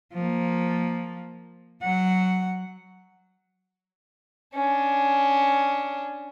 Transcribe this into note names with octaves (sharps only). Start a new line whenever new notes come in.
F3 A#3
F#3 F#5
C#4 D4